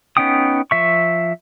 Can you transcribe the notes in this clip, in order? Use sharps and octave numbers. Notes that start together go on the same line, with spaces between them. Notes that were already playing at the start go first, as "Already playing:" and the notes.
B3 C#4 D#4 G5 D#6
F3 E5 C#6